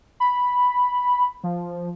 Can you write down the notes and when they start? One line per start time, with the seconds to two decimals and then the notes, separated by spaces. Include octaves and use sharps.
0.20 B5
1.44 F3